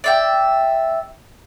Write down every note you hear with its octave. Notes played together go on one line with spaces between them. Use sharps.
D5 E5 G5